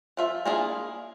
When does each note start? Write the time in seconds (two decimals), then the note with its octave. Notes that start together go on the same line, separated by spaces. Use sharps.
0.17 F3 F4 E5
0.45 A#3 D4 E4 F4 G#4